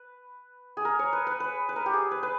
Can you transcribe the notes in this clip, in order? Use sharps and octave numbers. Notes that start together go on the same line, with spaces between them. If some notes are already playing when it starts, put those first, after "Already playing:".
Already playing: B4
G#4
A#4
C#5
B4
B4
B4
B4
A#4
G4
G#4
B4
B4